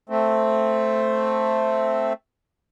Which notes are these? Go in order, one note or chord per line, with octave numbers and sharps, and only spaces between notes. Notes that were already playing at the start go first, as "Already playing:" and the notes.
A3 C4